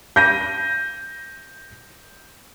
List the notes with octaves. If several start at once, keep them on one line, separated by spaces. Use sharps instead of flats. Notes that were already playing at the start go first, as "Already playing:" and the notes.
G6 A#6 D#7